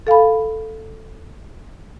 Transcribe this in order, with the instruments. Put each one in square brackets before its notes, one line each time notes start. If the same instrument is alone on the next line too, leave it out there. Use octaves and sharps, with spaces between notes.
[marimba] A4 F5 G#5 B5